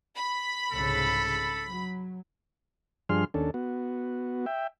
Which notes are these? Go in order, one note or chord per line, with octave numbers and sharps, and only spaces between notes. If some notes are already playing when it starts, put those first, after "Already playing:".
B5
C2 G#2 C#3 A4
F#3
G2 F3 D4 G#4 C6 F6
D#2 C#4 D4 A4
B3 F#4
E5 G5